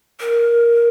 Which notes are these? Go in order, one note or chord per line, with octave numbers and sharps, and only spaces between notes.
A#4